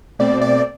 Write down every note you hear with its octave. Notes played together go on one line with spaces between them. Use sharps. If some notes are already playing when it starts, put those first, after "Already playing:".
B2 A3 C4 D5
D5